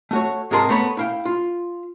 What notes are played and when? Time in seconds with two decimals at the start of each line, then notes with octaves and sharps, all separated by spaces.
0.11 A3 F#4 C#5
0.51 G#2 C3 G#4 A#4 A5 C6
0.69 A3 B3 C#5 B5
0.97 E4 F5 G5
1.25 F4